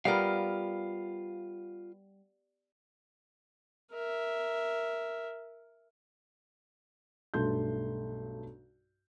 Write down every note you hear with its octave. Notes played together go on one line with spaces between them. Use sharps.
G3 B3 F4 A#4 F5
A#4 E5
B1 G2 A3 A5 C6 G6